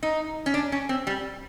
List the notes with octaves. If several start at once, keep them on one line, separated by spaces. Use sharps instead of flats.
D#4
C#4
D4
C#4
C4
G3